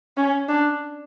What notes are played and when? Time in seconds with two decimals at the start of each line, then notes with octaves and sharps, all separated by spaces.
0.17 C#4
0.48 D4